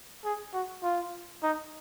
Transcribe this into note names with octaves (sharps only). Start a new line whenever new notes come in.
G#4
F#4
F4
D#4